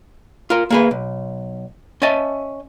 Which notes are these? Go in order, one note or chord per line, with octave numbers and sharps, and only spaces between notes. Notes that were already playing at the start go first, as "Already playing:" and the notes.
F4 A#4
A#3 G#4 B4
B1
C#4 D#5 E5 G#5 A5